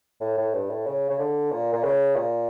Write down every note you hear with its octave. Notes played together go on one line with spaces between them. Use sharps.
A2
A2
G2
A2
C#3
C#3
D3
A#2
A#2
C#3
A#2